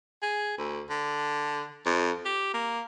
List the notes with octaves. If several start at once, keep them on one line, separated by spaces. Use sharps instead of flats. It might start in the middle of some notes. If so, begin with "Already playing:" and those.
G#4
D2
D3
F2
G4
A#3